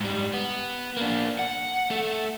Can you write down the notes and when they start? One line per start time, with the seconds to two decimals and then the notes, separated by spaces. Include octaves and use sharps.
0.01 G#2 G3
0.34 B3
0.97 A#3 D4
1.39 F#5
1.90 A3 A4